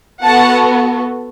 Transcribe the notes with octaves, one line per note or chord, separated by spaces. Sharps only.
B3 F#4 A4 F#5 A5